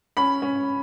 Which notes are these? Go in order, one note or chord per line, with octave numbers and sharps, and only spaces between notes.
C#4 B5
C#4